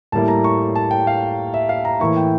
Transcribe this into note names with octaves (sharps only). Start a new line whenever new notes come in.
A2 G3 A#3 E4 A5
A#5
C#6
A5
G5
F5
E5
F5
A#5
A2 E3 A#3 E4 C#6
G5